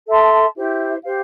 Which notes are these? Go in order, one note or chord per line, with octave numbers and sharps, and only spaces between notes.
A4 E5 A5 C6
E4 G4 C5 E5
G4 C5 F5